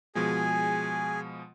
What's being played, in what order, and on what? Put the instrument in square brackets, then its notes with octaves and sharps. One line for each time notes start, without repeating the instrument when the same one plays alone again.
[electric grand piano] B2 F3 G#3 [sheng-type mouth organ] G#4 G#5